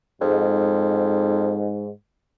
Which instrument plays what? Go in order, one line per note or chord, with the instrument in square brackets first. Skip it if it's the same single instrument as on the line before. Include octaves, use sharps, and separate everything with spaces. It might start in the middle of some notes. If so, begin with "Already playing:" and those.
[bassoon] F2 [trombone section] G#2